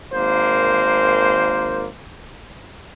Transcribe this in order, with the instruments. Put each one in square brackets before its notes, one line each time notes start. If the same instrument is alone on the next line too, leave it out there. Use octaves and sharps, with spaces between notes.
[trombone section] G#1 A#3 C5